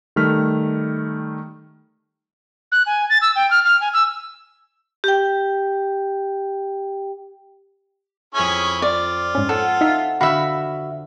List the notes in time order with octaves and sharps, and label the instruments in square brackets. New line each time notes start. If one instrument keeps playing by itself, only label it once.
[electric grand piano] D#3 G3 A3 F6 B6
[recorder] F#6
G#5
A6
E6
G5
F6
F6
G#5
E6
[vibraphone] G4 G5
[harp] F2 A4 G#6 [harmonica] C#4 E4 G#4
[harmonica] F4 [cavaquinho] D5
[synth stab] G#2 C#4
[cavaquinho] A4 [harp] F#5 E6
[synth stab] D#4 E5 F5
[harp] D3 D4 [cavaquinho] F#4 E5 [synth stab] F5 B5